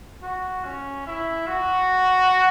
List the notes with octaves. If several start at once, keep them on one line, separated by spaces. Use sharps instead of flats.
F#4
C#4
E4
F#4